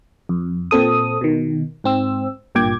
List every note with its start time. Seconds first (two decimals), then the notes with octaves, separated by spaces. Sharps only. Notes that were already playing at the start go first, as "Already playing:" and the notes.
0.29 F2
0.71 A#2 C4 A4 D#6
1.21 B2 D#3
1.84 G#2 C4 E6
2.55 G#1 G2 A#2 G5 D6 G#6